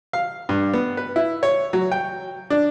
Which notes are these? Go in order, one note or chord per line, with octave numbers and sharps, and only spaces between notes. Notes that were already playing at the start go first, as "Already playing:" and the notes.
F5
G2
B3
B4
E4
C#5
F#3
G5
D4